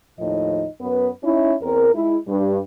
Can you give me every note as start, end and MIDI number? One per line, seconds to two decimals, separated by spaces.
0.19 0.66 39
0.19 0.66 45
0.19 0.66 53
0.19 0.66 63
0.19 0.66 75
0.81 1.09 42
0.81 1.09 59
0.81 1.09 71
1.24 1.54 61
1.24 1.54 63
1.24 1.54 64
1.61 1.89 40
1.61 1.89 60
1.61 1.89 70
1.95 2.17 56
1.95 2.17 64
2.27 2.58 43